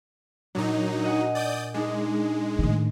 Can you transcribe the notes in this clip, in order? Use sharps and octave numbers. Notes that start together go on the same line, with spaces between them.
A#2 F#3 D4 D#4
D#5 F#5 G#5
D5 D#6 G6
G#3 D4 D#4
A2 D#3